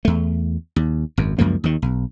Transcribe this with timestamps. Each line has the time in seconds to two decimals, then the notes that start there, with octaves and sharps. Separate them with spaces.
0.05 E2 A3
0.76 D#2
1.17 G#1 F#2
1.38 C#2 F#2 F3 A#3
1.64 D#2 D#3
1.82 B1